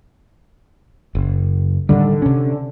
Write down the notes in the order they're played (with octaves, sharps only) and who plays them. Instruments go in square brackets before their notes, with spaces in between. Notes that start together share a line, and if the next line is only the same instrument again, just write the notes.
[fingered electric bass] F#1
[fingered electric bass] A2 D#3 G3 [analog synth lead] D3
[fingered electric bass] C3 C#4